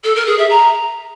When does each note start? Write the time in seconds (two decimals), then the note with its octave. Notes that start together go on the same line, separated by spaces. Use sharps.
0.04 A4
0.15 A#4
0.27 G#4
0.38 E5
0.50 A#5